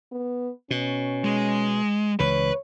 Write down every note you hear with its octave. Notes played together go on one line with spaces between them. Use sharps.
B3
B2 C#4
G#3
C#2 E3 B4 C#5